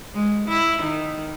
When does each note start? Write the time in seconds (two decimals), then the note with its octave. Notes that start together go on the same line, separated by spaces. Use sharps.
0.14 G#3
0.48 E4
0.82 D#3